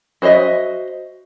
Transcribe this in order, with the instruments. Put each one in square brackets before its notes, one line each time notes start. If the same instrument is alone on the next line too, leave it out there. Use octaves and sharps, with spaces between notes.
[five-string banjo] F#4 C5 C#5 D#5 E5